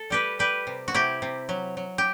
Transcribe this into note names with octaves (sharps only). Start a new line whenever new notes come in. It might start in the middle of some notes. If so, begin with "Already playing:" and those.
Already playing: A4
G3 G4 B4
G3 G4 B4
C3
F#4
C3 E4 G4
C3
F#3
F#3
G4